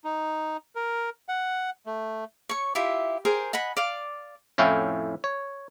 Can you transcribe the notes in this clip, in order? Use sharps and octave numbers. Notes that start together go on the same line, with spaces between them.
D#4
A#4
F#5
A3
C#5 C#6
E4 F4 G4 E5
G#4 A#4 C5 G5
D#5 F#5 G#5 B5
D5 F5 D6
F2 A2 C#4 E4 F5 G5
C#5